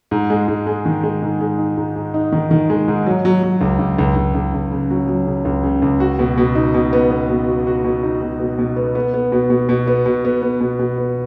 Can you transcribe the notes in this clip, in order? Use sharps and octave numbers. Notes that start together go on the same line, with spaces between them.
G#2
G#3
G#2
G#3
D#3
G#3
G#2
G#3
D#4
G#2
G#2
D#4
D#3
D#3
G#3
G#2
F#3
F#3
F#3
C#2
C#2
C#2
C#2
C#2
C#2
C#3
F#3
F#3
C#3
C#2
C#3
C#2
F#4
B2
B2
D#4
B2
B3
B3
B2
F#4
F#4
B2
D#4
B2
B2
B2
B3
B3
B3
B2
B2
B2
B3
B2
B3
B3
B2
B2
B3